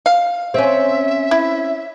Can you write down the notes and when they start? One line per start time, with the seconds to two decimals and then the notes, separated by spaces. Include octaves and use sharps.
0.06 F5
0.54 C4 C#4 E5
1.31 E4